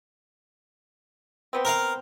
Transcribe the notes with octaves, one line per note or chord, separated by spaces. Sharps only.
B2 B3 C4
A#4 F5